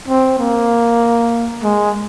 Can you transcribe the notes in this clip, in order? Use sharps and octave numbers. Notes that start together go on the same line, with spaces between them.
C4
A#3
G#3